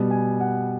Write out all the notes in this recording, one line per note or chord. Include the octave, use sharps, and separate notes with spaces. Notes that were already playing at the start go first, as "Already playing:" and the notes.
Already playing: B2 G3 B3
G#5
F#5